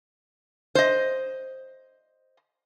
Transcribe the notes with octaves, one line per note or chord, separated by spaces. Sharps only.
C5 D#5